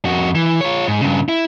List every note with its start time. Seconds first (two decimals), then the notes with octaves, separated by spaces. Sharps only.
0.05 F2 F#4
0.35 E3
0.61 F4 C#5
0.88 G#2
1.01 G2 C#3
1.29 E4